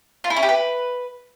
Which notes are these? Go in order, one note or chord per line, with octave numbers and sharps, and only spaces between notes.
F4
E4
C#4
G4
B4